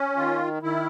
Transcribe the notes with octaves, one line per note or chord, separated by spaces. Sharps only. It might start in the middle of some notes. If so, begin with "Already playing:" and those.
Already playing: C#4
D#3 F4
D#3 E4